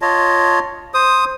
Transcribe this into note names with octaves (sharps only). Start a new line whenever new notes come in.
F4 C#5 D#5 A5
C5 D#6